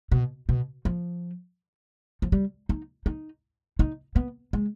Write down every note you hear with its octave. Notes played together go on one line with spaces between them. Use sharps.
B2
B2
F3
F3
G3
D#4
D#4
D#4
B3
G#3